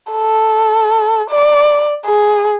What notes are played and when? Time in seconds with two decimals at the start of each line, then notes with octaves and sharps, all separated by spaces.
0.12 A4
1.30 D5
2.05 G#4